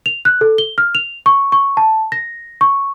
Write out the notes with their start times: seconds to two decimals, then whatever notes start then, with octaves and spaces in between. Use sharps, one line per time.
0.06 F7
0.25 F#6
0.41 A4
0.58 G7
0.78 F6
0.95 F7
1.26 C#6
1.52 C#6
1.77 A5
2.12 A#6
2.61 C#6